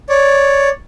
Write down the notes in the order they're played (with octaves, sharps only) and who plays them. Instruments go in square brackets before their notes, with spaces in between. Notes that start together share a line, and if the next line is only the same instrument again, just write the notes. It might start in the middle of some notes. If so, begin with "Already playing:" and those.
[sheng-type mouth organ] C#5 D5